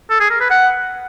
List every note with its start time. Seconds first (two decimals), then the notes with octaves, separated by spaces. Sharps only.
0.10 A4
0.20 G#4
0.30 A#4
0.40 B4
0.50 F#5